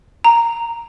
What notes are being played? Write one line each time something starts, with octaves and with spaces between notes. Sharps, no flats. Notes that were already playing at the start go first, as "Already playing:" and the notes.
A#5